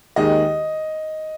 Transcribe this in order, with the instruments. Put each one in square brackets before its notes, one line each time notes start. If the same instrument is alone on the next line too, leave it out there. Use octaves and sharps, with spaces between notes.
[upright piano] D#2 D#3 G#3 D#4 G#4 [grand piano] D#5